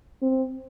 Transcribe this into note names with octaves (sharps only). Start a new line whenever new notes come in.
C4